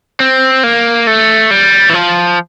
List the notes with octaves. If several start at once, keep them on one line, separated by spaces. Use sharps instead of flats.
C4
A#3
A3
G3
E3
F3